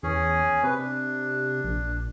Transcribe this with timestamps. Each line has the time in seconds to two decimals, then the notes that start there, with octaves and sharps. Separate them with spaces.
0.03 E2 C#4 G#4
0.63 C3 B4
0.79 D4
1.64 A#1